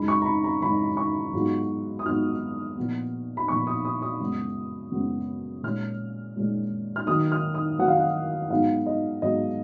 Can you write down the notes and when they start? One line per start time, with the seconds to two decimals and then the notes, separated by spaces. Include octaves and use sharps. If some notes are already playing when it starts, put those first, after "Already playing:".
Already playing: F#2 C#3 G#3 D#4 B5
0.08 C#6
0.22 A#5
0.26 B5
0.44 A#5
0.62 F#2 C#3 G#3 D#4 B5
0.97 C#6
1.33 G#2 F#3 B3 F4
1.99 D#6
2.05 G#2 F#3 B3 F4 F6
2.77 A#2 F3 B3
3.37 B5
3.48 A#2 F3 B3 C#6
3.67 D#6
3.85 D#6
4.02 D#6
4.20 F#2 C#3 G#3 B3
4.91 F#2 C#3 G#3 B3
5.63 A#2 G#3 C#4 F6
6.36 A#2 G#3 C#4
6.96 F6
7.07 D#3 F#3 A#3 D#4 D#6
7.32 F6
7.54 D#6
7.79 D#3 F#3 A#3 D#4 F#5
7.88 F5
7.97 F#5
8.50 G#2 F#3 B3 D#4 F5
8.86 D#5
9.22 G#2 F#3 B3 D#4 D#5